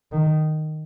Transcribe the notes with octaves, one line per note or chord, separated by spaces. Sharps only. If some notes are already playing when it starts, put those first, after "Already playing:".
D#3